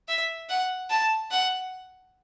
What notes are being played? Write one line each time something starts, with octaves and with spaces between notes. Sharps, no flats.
E5
F#5
A5
F#5